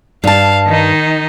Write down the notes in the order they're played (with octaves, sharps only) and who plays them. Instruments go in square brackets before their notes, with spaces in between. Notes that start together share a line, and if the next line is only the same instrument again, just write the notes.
[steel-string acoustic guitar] G2 A5 [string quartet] F5
[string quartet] D#3 D#4